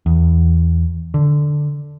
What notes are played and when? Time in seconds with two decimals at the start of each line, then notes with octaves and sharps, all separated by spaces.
0.06 E2
1.14 D3